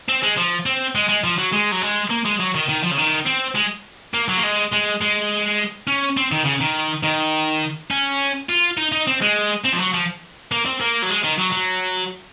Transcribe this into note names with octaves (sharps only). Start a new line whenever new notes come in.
C4
G#3
F3
C4
G#3
G#3
F3
F#3
G#3
F#3
G#3
A#3
G#3
F#3
D#3
D#3
F3
C#3
D#3
C4
G#3
A#3
F#3
A#3
G#3
G#3
G#3
C#4
C4
D#3
C#3
D#3
D#3
C#4
F4
D#4
D#4
C4
G#3
C4
F3
F#3
F3
A#3
C4
A#3
F#3
G#3
D#3
F#3
F#3